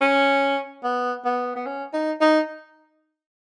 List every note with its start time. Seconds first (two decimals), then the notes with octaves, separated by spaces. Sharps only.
0.02 C#4
0.84 B3
1.25 B3
1.56 B3
1.66 C#4
1.93 D#4
2.21 D#4